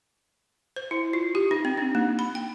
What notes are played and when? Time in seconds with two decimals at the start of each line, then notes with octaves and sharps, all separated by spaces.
0.76 C5
0.91 E4
1.13 F4
1.35 G4
1.51 D#4
1.65 C4
1.78 D4
1.95 A#3
2.19 B5
2.35 G5